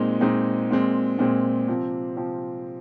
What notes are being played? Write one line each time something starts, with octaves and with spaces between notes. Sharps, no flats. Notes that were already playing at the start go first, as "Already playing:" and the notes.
Already playing: A#2 G#3 C4 D#4
A#2 G#3 C4 D#4
A#2 G#3 C4
A#2 G#3 C4
C3 F3 C4
C3 F3 C4